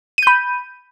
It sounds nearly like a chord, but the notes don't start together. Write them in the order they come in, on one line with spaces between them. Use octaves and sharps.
D#7 G6 B5